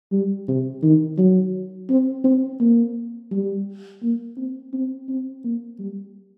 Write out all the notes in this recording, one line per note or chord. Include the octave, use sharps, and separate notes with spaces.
G3
C3
D#3
F#3
C4
C4
A#3
G3
A#3
C4
C4
C4
A#3
G3